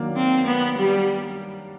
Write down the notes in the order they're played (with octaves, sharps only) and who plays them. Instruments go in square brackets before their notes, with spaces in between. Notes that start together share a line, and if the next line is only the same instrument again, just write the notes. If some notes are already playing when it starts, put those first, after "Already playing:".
Already playing: [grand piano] D#3 F#3 A#3 D4
[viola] C4
B3
G3